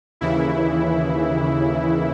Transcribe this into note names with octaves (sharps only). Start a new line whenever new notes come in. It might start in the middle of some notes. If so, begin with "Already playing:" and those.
D#2 C#3 E3 E4